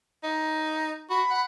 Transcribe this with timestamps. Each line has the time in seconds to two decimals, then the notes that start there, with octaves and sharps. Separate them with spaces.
0.23 D#4
1.10 F#4 B5
1.31 F#5